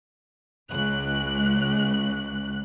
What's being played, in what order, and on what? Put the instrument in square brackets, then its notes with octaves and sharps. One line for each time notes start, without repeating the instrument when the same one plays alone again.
[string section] C#2 F#6